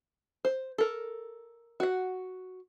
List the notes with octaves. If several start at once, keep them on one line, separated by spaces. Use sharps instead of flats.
C5
A4 A#4
F#4 F#5